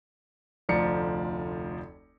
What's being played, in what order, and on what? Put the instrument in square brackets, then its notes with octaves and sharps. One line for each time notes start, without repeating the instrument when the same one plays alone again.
[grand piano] F1 D2 F3 D5 A#5 C#7